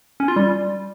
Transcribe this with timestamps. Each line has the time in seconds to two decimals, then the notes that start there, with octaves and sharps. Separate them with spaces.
0.20 C#4
0.28 F4
0.36 G3